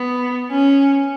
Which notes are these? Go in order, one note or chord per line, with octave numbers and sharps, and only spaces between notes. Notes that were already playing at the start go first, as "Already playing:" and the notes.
Already playing: B3
C#4